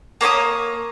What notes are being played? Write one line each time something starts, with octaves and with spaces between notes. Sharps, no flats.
A#3 C#5 B5 D#6